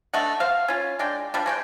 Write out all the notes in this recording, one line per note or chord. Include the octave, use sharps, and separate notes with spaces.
A3 D4 D#5 F#5
C5 F5
C#4 F4
G#3 D4 D5 G5
F3 G3 D4
G#3 C#5 G5